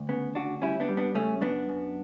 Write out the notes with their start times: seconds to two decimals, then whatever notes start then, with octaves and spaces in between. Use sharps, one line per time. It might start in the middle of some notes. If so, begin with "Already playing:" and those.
Already playing: D2
0.09 C#3 B3
0.35 D2 D4 F#4
0.62 G3 C#4 E4
0.80 B3 D4
0.88 G3
0.97 B3 D4
1.15 C#3 A3 C#4
1.41 F#2 B3 D4
1.69 F#2